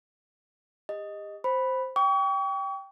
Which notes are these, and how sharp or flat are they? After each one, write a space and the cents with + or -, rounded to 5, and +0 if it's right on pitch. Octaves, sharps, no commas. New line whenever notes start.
G4 +40 D#5 +0
C5 +0 B5 +0
G5 +0 C#6 +40